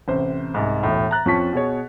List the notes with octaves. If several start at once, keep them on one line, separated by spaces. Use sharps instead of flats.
A1 C3 C5
C2 G#2
E1 A2
A#5 F#6 A6
F2 C#4 F4 A5 C#6 B6
B2 G#4 C#5